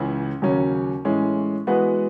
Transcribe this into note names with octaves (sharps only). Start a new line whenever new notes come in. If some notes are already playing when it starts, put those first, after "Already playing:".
Already playing: C#2 C#3 E3
D#2 C#3 F#3 C#4
A2 E3 G#3 C#4
E3 G#3 B3 F#4 B4